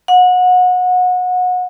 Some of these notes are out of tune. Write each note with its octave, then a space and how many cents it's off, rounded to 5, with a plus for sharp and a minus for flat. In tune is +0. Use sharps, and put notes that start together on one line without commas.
F#5 -25